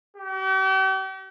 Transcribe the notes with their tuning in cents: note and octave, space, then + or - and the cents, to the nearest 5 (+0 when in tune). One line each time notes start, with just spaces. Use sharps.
G4 -45